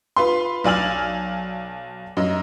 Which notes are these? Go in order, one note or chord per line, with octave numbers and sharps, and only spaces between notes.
F4 B4 C6
B1 D5 G#5 F6 F#7
F#2 D#5